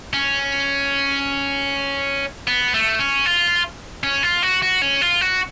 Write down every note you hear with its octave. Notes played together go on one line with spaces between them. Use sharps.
C#4
B3
A3
C#4
F4
C#4
F4
F#4
F#4
C#4
F4
F#4